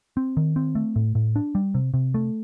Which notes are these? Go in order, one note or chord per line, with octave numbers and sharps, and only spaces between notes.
C4
D#3
C4
A3
A2
A2
D4
G3
C3
C3
A3